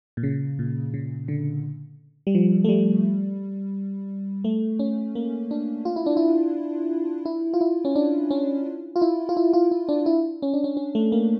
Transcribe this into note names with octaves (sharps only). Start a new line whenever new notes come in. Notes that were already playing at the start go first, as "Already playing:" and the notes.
A#2
C#3
A#2
C#3
D3
G3
F3
A3
G3
A3
C#4
A#3
D4
F4
E4
D4
E4
E4
F4
E4
C#4
D4
C#4
F4
E4
F4
E4
F4
E4
D4
E4
C#4
D4
C#4
C#4
A3
A#3